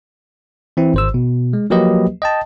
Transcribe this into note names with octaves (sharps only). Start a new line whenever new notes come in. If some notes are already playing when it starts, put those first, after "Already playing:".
E3 C4 E4
G#1 C5 E6
B2
G#3
F3 F#3 A#3 G4 B4 D#5
D#5 G5 A5